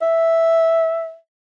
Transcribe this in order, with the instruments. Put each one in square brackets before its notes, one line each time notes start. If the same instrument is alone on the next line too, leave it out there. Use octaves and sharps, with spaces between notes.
[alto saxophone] E5